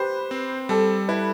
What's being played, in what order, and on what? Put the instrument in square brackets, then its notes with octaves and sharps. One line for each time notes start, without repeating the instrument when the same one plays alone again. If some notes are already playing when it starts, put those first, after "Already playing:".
Already playing: [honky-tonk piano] G4 B4 [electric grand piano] C5
[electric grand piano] C4
[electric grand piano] G3 [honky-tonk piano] A4
[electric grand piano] E4 [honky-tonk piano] B4